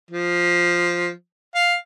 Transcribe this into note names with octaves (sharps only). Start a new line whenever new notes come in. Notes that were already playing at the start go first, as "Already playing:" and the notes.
F3
F5